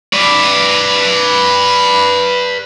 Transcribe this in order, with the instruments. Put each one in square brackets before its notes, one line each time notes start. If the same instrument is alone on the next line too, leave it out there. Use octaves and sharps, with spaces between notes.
[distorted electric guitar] B4 D5